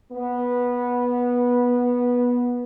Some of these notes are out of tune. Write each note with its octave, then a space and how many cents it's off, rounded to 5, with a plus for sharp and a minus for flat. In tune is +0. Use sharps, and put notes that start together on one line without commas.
B3 -15